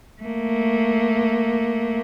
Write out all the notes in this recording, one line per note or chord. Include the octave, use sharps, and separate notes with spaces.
A3 A#3